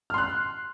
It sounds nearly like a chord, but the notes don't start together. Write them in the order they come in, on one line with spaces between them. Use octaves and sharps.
F6 C6 F#6